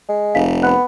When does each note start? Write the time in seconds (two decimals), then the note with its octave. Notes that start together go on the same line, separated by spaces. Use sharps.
0.09 G#3
0.34 F1 F5 B6
0.63 B3 B5 F#6